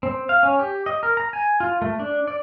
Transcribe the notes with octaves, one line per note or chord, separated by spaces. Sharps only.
C4
F5
C#4
G4
D#5
A#4
A#5
G#5
F4
A3
D4
D5